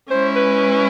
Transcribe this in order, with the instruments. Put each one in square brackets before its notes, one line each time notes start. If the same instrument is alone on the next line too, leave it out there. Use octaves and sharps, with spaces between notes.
[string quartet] G#3 C#4 E4 [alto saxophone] C5
[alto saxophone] B4